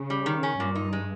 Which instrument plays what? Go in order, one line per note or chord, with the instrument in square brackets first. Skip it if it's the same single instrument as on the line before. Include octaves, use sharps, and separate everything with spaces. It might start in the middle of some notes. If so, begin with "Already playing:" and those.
Already playing: [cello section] C#3
[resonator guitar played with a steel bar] G3
D#3
C#4
[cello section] G2 [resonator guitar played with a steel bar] A#2
[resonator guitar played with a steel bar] D#4
G#3